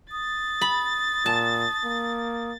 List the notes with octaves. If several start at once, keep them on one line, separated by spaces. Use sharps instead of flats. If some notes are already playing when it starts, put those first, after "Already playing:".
D#6 A6
B5
A#2 A5
A#3